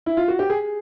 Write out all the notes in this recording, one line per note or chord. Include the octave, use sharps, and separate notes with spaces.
E4
F4
F#4
G4
G#4